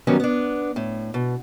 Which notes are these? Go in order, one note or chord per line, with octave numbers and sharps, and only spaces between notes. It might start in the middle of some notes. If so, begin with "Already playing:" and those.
D#3 F#3 G3 B3 C#4
B3 D4
A2
B2